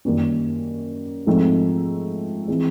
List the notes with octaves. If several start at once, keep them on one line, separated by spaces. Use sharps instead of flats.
F#2 D#3 G3 A#3 C#4
G#2 F3 A3 C4 D#4
E3 G#3 C4